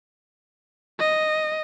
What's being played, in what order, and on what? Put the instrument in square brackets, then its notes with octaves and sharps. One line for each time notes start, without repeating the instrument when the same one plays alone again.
[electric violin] D#5